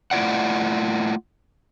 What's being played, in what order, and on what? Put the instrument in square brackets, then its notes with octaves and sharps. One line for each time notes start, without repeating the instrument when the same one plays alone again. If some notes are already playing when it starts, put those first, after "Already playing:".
[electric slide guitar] A3 E4 F4 D5 F#5